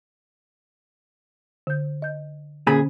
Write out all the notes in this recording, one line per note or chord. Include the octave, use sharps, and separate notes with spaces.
D3 G6
D#5 G6
A#2 D3 C#4 G#4 B5